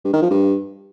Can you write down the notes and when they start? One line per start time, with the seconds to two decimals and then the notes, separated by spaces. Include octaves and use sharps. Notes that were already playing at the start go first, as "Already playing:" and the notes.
0.05 G2
0.13 D#3
0.22 F3
0.31 G2